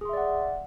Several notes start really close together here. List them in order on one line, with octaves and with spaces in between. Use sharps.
G#4 C6 E5 D5 F#5